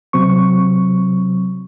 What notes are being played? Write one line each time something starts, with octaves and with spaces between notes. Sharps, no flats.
C3 F#3 C4 C#6